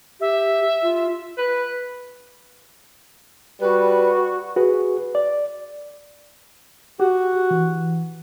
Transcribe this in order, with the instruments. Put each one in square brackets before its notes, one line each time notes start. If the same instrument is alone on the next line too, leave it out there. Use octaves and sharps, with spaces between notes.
[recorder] G4 [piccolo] E5
[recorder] F4
[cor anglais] B4
[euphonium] G3 [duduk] F#4 [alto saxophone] B4
[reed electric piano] F#4 G#4 B4
D5
[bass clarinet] F#4 [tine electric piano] G4
[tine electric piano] E3